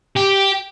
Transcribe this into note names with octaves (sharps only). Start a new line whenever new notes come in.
G4